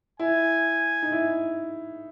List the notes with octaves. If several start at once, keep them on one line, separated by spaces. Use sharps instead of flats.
E4 G#5
D#4
E4